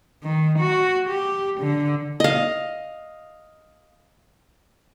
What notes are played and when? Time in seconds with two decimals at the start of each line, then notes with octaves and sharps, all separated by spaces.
0.23 D#3
0.59 F#4
1.09 G4
1.61 D3
2.20 D#5 F5